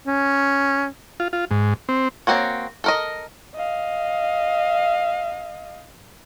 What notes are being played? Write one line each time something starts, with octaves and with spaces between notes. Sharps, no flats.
C#4
F4
F4
G#2
C4
A#3 C4 F#4 C#5
A4 A#4 D#5
D#5 F5